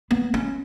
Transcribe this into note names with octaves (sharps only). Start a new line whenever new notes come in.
B3
C#4